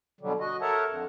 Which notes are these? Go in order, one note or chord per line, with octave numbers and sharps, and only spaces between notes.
B2 D3 F#3 G3
F#4 D#5
A4 A#4 C#5 E5 F#5 A5
F2 D3